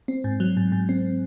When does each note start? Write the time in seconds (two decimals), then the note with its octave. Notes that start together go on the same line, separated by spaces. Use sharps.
0.08 C4
0.24 G#2
0.40 F#3
0.57 G#2
0.72 G#2
0.89 C4